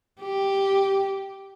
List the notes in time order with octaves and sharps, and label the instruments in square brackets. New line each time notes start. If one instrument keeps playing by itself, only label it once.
[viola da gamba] G4